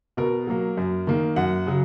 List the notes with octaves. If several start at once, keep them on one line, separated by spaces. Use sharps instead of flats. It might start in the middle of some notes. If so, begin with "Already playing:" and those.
B2 A#4
F#3 A#3
F#2
D#3 A#3
F#2 F#5
C#3 F#3